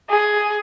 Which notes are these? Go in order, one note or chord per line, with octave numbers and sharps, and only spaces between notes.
G#4